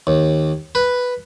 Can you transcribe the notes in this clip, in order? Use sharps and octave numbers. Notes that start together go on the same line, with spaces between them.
D#2
B4